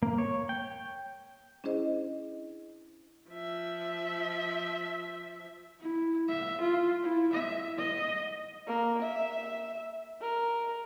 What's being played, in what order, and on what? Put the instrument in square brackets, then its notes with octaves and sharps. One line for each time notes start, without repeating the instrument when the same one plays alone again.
[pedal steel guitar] A#3
C#5
G5
[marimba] C#4 D4 E4 G#4 C5 D#5
[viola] F3 E5
[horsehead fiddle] E4
E5
F4
E4
E5
D#5
[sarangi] A#3
E5
A#4